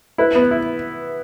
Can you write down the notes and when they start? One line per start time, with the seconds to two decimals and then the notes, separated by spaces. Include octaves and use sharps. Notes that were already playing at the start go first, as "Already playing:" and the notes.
0.18 E4 B4
0.35 B3
0.51 E4